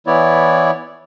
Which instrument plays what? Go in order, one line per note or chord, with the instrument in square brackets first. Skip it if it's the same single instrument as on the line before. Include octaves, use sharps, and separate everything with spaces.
[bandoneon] E3 B3 E4 C#5 D5